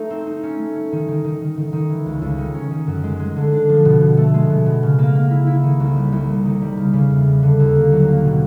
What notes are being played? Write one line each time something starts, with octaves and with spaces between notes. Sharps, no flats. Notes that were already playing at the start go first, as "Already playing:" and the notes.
Already playing: A3 D#4
C4
D#4
C#4
A3
C#4
D#3
D#3
D#3
D#3
D#3
D#3
E3
C#2
C#2
D#3
C#4
D#3
F#2
G#3
G#3
D3
D4
F3
B2
B2
A3
G#3
B2
B2
C#3
A#3
A#3
E4
E4
D#3
C2
G3
C2
D#3
D#3
G3
C#3
C#3
E2
G3
D3
D#2
A#3
F#3
A#3
B2